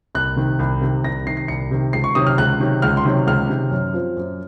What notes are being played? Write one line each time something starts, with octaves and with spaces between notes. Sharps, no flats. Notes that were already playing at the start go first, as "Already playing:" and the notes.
C2 F#6
C3 D#3
C2
C3 D#3
C2 A#6
C3 D#3 C7
C7
C2 C#7
C3 D#3
C#2 C7
C#6
C3 D#3 F#3 D#6
F6
C#2 F#6
C3 D#3 F#3
C#2 F6
C6
C3 D#3 F#3
C#2 F6
C3 D#3 F#3
F#2
F3 C4
F#2